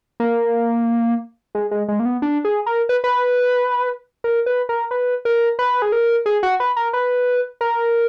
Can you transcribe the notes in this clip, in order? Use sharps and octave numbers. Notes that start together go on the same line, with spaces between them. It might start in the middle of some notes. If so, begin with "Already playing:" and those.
A#3
G#3
G#3
G#3
A#3
B3
D4
G#4
A#4
B4
B4
A#4
B4
A#4
B4
A#4
B4
G#4
A#4
G#4
F#4
B4
A#4
B4
A#4